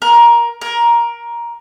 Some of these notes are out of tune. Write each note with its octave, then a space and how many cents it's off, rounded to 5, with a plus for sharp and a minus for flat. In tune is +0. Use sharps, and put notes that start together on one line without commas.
A#4 +15
A#4 +15